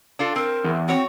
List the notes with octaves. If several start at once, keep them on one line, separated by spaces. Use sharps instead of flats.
D4 F4 A4
C4 A#4
E2
C4 F#4 C#5